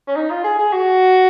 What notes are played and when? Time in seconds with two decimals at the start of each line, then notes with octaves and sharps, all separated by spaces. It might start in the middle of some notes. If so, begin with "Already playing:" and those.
0.08 C#4
0.16 D#4
0.31 F4
0.44 G#4
0.59 G#4
0.73 F#4